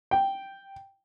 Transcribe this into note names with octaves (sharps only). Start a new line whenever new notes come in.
G5